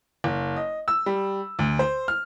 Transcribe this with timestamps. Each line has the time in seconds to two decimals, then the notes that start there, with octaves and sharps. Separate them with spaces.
0.24 F#1
0.56 D#5
0.88 E6
1.06 G3
1.59 D2
1.79 C5
2.08 F6